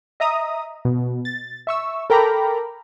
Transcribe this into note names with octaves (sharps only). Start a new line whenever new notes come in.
D#5 E5 A#5 D#6
B2
A6
E5 C#6 E6
A4 A#4 G5 A#5 B5 D6